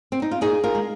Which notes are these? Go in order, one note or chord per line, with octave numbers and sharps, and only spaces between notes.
C4
D#4
F4
A#2 D#4 G#4
F4 A#4
G#3